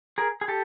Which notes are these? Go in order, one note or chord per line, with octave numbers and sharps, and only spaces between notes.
G#4 A#4
G#4
G4 A4